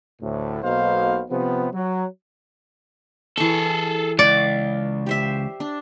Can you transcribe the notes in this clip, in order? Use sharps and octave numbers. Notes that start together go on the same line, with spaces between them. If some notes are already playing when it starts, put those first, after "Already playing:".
D2 A2
B1 B2 A#3 D#4 C5 F5
C3 F3 B3
F#3
E3 G#4 A4 C#6
C#2 D5
G4 C5 E5
D4